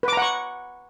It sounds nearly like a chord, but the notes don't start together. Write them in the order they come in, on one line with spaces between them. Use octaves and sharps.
B4 D6 A#5 F#5 C#6